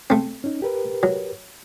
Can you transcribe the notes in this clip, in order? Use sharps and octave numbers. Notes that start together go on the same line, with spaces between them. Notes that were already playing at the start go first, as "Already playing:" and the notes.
A3 C4
C#4 D#4
G4 A#4 B4
F#3